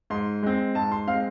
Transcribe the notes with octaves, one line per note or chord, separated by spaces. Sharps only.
G#2 C6
G#3 C4
G#2 A5
C6
G#3 C4 F5